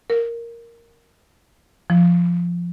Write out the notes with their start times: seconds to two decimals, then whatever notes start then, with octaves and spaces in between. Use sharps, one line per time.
0.10 A#4
1.90 F3